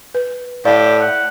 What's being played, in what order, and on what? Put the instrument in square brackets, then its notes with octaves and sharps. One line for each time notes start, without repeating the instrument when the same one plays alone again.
[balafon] B4
[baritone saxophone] A2 [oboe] G4 [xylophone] D5 [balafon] F5
[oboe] F#5